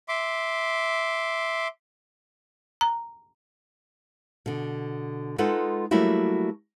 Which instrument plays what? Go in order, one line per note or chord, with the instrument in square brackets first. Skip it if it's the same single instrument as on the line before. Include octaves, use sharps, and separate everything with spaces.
[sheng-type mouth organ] E5 C6 D6
[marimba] A#5
[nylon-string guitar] B2 D3
G#3 D#4 F4 A4 B4 F#5
F#3 G3 A3 A#3 E4 F#4